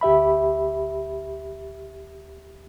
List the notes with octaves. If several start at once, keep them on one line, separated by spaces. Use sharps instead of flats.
D2 G4 E5 B5